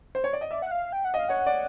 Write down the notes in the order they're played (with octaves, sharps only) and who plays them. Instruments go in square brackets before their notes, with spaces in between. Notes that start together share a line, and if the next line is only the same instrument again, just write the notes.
[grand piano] C5
C#5
D5
D#5
[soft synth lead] D5 [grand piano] E5
[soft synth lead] F#5
F5
G5
F#5
[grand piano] D#5
[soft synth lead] F5
[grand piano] C#5 [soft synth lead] F#5
[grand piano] D5